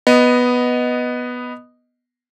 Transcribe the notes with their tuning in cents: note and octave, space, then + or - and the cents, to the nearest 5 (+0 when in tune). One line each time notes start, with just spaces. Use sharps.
B3 +0 D#5 +0